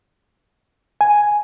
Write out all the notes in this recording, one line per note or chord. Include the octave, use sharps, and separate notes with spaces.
G#5